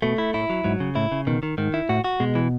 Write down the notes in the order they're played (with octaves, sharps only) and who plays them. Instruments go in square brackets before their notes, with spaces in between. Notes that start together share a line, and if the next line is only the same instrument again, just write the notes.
[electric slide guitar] B2 [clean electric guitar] A3
[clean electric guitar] E4
[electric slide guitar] A2 [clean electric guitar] E4
[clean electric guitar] F#3
[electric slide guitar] G#2 [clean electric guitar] F#3
[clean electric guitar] C#3
[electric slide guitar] A2 [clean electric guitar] E4
[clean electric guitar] C#3
[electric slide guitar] B2 [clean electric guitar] D#3
[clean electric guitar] D#3
[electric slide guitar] G#2 [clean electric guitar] D#3
[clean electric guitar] E4
[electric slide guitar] A2 [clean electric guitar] F#4
[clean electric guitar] F#4
[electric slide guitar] B2 [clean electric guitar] G#3
[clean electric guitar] E3